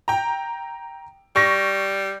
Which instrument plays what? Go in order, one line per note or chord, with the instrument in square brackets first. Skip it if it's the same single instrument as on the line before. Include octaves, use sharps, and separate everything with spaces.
[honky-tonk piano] G5 A#5
[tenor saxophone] G3 [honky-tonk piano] C#6 A#6